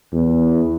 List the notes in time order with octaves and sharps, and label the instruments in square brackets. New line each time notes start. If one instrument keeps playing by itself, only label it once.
[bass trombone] E2